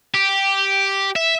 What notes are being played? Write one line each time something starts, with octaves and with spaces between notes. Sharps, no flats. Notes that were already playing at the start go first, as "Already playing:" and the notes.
G4
E5